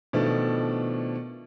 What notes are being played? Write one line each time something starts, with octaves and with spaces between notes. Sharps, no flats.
B2 D#3 F3 A3 D4